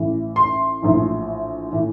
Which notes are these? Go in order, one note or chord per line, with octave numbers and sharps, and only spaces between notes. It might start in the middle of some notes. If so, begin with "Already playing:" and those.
Already playing: A1 A2 E3
C6
A#1 A2 E3
A2 E3